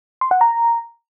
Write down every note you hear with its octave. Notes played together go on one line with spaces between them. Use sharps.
C6
F#5
A#5